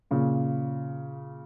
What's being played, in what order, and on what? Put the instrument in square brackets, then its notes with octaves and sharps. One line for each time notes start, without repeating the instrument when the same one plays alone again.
[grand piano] A#2 C#3